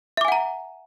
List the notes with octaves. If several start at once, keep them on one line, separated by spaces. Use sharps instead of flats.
E5 F#5 G#5 A#5 D6